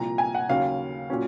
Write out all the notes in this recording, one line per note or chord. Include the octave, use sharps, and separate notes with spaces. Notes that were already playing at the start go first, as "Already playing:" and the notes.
Already playing: C2 A#2 F3 A#5
G#5
F#5
D#2 C#3 F#3 C#4 F5
A#2 F#3 C#4